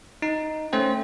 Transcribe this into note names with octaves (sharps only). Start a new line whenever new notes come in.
D#4
A3 C#4 C5 G5